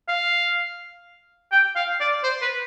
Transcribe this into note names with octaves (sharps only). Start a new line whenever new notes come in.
F5
G5
F5
D5
C5
B4